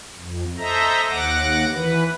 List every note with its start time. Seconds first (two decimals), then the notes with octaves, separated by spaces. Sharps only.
0.17 F2
0.58 A4 C5 D#5 E5 A#5
1.10 D#2 F#5 D6 A#6
1.74 E3 B4